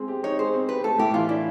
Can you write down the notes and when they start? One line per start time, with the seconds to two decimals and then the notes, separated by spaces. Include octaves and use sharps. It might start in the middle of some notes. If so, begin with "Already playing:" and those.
Already playing: G#3 C4
0.08 G4
0.23 D#4 C#5
0.39 G#3 C5
0.54 C4
0.68 G4 B4
0.83 A3 A4
0.98 A2 G4
1.14 E3 F4
1.29 D4 E4